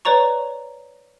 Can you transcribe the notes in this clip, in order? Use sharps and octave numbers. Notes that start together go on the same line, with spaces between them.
B4 C#5 D5 A#5 C#6